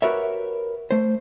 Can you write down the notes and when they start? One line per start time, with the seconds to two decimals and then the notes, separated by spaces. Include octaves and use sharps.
0.02 F#4 G4 A#4 B4 C#5 E5
0.91 A3 C5